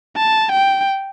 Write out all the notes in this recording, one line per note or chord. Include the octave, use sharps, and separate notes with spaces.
A5
G5